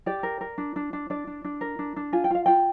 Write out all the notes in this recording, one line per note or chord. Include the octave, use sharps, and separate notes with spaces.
G4 D5
A#4
A#4
D4
D4
D4
D4 D5
D4
D4
A#4
D4
D4
F4 G#5
G5
F4 F5
F4 G5